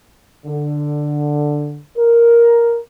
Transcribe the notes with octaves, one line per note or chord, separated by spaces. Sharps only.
D3
A#4